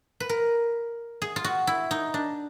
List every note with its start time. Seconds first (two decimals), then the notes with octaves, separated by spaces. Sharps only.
0.20 B4
0.29 A#4
1.22 G#4
1.36 F4
1.44 F#4
1.67 E4
1.91 D#4
2.14 D4